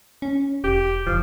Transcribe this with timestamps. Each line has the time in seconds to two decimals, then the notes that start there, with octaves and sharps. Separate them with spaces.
0.22 C#4
0.64 E1 G4
1.06 F#1 F3